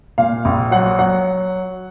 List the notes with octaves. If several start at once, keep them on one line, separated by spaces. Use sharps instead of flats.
A#2 F5
A#1
F#3 F#5
F#3 F#5